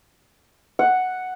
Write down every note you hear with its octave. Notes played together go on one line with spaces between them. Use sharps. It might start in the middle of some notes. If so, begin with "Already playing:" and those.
F#5